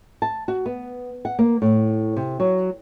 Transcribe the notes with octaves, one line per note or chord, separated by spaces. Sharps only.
A5
F#4
B3
F#5
A#3
A2
C3
F#3